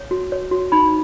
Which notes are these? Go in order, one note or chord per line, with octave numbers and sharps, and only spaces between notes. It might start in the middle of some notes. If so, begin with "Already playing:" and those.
Already playing: C#5
F#4
C#5
F#4
D#4 B5